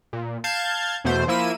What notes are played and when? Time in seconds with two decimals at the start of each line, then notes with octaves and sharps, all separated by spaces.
0.13 A#2
0.44 F5 A5 G6 G#6
1.05 E2 B2 A3 C5
1.28 F3 A#3 E4 E6 D#7